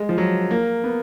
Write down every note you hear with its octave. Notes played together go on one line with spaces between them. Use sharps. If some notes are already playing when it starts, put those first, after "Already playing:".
Already playing: G#3
F3
F#3
A#3
B3